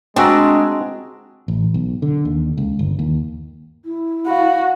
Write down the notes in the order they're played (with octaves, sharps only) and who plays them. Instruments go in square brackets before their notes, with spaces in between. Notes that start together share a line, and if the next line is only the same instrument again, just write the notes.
[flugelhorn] G#3 [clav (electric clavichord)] C4 F#4 A#5 [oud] D4 [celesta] G5 G#5 E6
[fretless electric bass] A1
B1
D3
D#2
C#2
G1
D#2
[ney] E4
[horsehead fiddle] F#4 [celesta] F5 B5